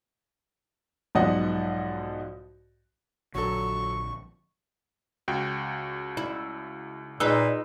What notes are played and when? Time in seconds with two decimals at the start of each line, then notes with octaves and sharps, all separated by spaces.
1.15 B1 G#2 F3 D5 D#5 F#5
3.35 A#1 D3 F#3 A4 C#6
5.28 C#2 F#4 G5
6.17 E4
7.20 A#2 D#4 G#4 B4 E6